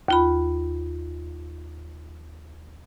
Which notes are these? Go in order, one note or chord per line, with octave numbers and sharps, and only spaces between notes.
D#2 F4 B5